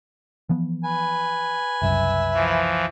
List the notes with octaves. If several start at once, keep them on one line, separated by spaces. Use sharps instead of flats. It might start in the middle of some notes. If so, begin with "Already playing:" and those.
E3 F3 B3
B4 G#5
F#1 C2 F#2 E5
E3 F3